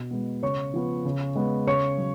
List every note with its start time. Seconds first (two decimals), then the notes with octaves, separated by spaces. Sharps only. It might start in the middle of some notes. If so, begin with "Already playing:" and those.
Already playing: B2
0.11 G#3 B3
0.43 C#3 C#5 C#6
0.74 F3 B3
1.05 C#3
1.35 G#3 B3
1.67 C#3 C#5 C#6
1.98 F#3